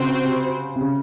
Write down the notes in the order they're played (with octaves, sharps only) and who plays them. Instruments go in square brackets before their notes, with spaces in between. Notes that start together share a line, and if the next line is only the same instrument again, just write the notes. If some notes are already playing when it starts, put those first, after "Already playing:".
Already playing: [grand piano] C#3 [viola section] C4 F#4 C5
[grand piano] C3
C3
C#3